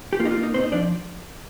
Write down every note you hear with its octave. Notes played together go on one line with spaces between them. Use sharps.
G4
A#3 F4
D#4
F4
A#3
D#4
A#2 C4 C5
D#4 D#5
F3 D4 D5